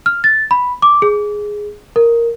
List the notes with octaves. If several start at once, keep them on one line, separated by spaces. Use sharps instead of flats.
F6
A6
B5
D6
G#4
A#4